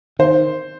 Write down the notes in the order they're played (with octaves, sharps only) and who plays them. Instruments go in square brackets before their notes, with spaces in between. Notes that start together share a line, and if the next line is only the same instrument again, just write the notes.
[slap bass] D#3 [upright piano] C5